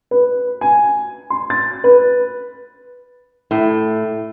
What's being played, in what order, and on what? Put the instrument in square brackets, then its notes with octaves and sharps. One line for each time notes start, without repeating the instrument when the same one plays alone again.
[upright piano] B4
G#5
C6
A6
B4
[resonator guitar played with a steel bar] A2